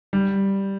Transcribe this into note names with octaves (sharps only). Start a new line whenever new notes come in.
G3